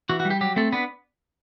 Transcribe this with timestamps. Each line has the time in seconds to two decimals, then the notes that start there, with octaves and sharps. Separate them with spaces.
0.09 E3 F#4
0.20 F#4
0.25 G3
0.30 G4
0.41 F#3 G4
0.56 A3 C4 A4
0.72 B3 D4 B4